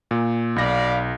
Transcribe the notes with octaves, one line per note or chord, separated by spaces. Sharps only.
A#2
B1 D5 F5 B5 A#6